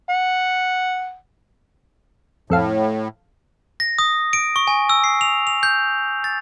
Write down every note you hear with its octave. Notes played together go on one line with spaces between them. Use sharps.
F#5
F2 A2 A4 F5
A#6
D#6
D7
C#6
G#5
E6
C7
F7
F7
G6
A6